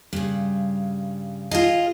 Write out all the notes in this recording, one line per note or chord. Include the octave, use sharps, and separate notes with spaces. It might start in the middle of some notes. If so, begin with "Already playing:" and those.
G2 C#3
F4 G#4 D#5